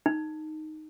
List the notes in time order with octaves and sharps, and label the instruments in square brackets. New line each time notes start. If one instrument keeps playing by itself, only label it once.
[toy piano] D#4